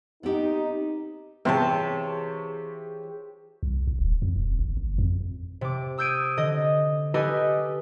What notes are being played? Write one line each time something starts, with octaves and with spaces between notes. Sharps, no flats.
B3 C4 D#4 G4
C3 E3 F4 G4 G#4 C5 C#5 A5
C2
B1
D#1
F2
E1
G1
G1
F2
C3 D6
D#6 E6 G6 G#6 D7 D#7
D3 D#5
G4 A4 B4 D#5 G#5